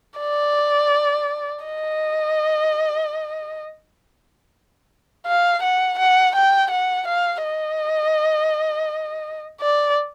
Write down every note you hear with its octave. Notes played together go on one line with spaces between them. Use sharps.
D5
D#5
F5
F#5
F#5
G5
F#5
F5
D#5
D5